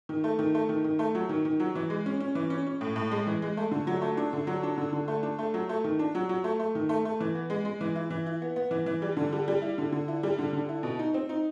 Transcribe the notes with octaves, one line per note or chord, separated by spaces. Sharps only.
D#3
A3
D#3
A3
D#3
D#3
A3
F#3
D#3
D#3
F#3
E3
G#3
C#4
C#4
E3
C#4
C#4
A2
A2
G#3
E3
G#3
A3
D3
F#3
A3
D4
D3
F#3
D4
D3
D3
A3
D4
A3
F#3
A3
D#3
D4
F#3
F#3
A3
A3
D#3
A3
A3
E3
B3
G#3
G#3
E3
E4
E3
E4
B3
B3
E3
E3
G3
D3
G3
G3
E4
D3
D3
E4
G3
D3
D3
E4
B2
D#4
C4
D#4